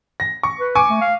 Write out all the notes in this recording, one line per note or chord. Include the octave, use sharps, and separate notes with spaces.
A#6
C#6
B4
G#5 C#6 D6
A3
F5